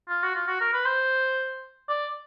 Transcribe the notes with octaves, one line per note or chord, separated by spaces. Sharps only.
F4
F#4
F4
F#4
A#4
B4
C5
D5